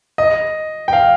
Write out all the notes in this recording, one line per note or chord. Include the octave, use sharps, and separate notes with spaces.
D#5
G5
F5